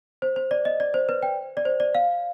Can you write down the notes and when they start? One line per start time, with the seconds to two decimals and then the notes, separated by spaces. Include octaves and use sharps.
0.22 C5
0.36 C5
0.51 D5
0.65 D#5
0.80 D5
0.94 C5
1.09 B4
1.23 G5
1.57 D5
1.65 C5
1.80 D5
1.95 F5